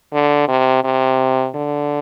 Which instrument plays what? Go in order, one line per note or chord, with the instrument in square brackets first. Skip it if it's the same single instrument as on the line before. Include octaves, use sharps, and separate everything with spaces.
[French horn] D3
C3
C3
D3